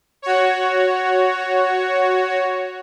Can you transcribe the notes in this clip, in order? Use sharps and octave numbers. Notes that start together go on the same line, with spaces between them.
F#4 C#5